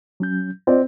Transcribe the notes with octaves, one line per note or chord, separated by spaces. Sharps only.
F#3 C#4 G6
C4 F4 D5 D#5